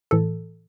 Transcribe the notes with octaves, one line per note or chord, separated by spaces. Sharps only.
A2 E3 A4